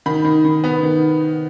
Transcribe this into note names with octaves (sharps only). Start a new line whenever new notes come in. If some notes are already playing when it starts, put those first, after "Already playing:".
D#3 B5
D#3
D#3
B3
D#3